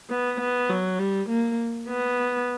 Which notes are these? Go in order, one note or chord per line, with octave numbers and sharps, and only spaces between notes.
B3
B3
F#3
G3
A#3
B3